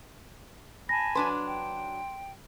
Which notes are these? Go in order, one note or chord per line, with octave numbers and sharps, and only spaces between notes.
G#5 A5 B5 A#6
F#3 D4 B4 C6
G5